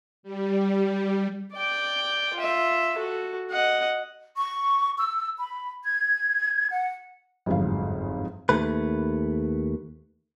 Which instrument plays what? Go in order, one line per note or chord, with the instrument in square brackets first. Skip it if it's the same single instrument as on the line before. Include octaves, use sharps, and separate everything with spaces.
[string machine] G3
[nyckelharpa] D5 G5
F4 E5
F#4 A4
D#5 F#5
[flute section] C#6
E6
B5
G#6
F#5
[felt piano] G1 F2 G#2 F#3 F5
[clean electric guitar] D#2 A3 B4